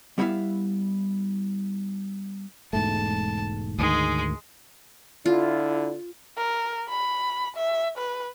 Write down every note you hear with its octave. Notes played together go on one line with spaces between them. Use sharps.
G3 B3 E4 E5 F5
E1 G#2 A3 A5
D2 G#2 D#3 G#3 G#4
D3 E4 F4
A#4
B5
E5
B4